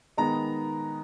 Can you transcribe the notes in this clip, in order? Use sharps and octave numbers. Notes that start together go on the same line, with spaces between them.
D#3 G#3 B3 D#4 A#5